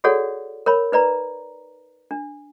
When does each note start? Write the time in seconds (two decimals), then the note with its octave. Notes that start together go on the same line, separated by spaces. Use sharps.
0.04 F#4 G#4 A4 C#5 D5 F#5
0.66 A#4 C#5 B5
0.92 D#4 B4 D5 A#5
2.11 D4